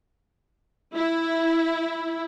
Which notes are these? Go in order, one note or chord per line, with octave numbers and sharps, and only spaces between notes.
E4